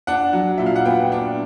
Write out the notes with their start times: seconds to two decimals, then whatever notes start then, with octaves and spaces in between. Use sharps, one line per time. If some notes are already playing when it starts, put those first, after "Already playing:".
0.07 D4 F#5
0.33 F#3
0.58 A#2 E5
0.66 F5
0.76 F#5
0.85 B3 G5
1.12 D4